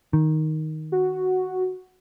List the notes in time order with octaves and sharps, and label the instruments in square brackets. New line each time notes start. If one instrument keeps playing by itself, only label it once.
[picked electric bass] D#3
[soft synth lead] F#4